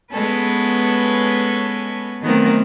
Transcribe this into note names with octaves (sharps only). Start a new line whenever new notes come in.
G#3 B3 C#4 A4 B4
D#3 F#3 A3 B3 C4 A#4